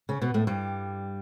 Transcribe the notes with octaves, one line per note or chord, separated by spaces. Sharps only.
C#3 C#4
B2 B3
A2 A3
G2 G3